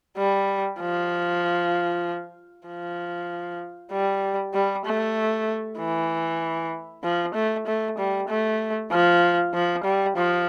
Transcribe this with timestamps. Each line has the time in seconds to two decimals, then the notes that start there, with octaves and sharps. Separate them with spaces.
0.17 G3
0.79 F3
2.67 F3
3.92 G3
4.54 G3
4.85 A3
5.79 E3
7.03 F3
7.35 A3
7.67 A3
7.98 G3
8.29 A3
8.92 F3
9.54 F3
9.84 G3
10.16 F3